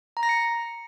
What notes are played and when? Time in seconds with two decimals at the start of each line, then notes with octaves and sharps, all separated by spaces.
0.17 A#5
0.23 A#6
0.29 C#7